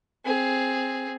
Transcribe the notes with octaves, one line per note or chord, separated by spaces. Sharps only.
C4 G#4